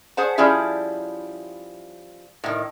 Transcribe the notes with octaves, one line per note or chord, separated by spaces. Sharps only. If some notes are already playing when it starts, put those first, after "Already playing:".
G#4 C5 F#5 A5
F3 G3 C#4 E4 G#4 E5
A2 D#3